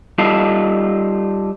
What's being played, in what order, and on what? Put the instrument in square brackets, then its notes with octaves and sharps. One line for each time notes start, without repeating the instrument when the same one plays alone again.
[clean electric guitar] G3 D#4 F4 A4